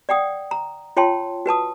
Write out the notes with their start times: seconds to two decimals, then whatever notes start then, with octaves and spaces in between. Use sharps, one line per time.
0.09 D5 F#5 G5 D#6
0.51 A#5
0.97 F4 C#5 G5 A5 C6
1.46 F#4 B4 A5 D#6